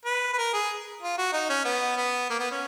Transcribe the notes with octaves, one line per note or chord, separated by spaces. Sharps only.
B4
B4
A#4
G#4
F4
F#4
D#4
C#4
B3
B3
A#3
B3
C#4